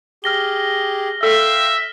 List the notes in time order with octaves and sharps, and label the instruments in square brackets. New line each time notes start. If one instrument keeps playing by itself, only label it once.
[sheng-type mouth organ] G4 G#4 [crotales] F6 A#6 G7
[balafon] A4 [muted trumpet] E5 [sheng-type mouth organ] F5 G5 C6